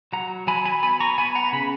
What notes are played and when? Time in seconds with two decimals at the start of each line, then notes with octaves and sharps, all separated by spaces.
0.13 F#3 F#5 A#5
0.47 F#3 G#5 B5
0.65 G#5 B5
0.82 B3 G#5 B5
1.00 A#5 C#6
1.18 B3 G#5 B5
1.35 F#5 A#5
1.53 C#3 B5